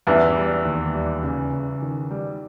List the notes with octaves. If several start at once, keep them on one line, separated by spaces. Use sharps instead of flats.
E2 E3 G3
G3
D#2
G3
C#3
C#3
D#3
G3